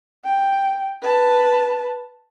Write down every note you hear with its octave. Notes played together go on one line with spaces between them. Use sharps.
G5
B4 A5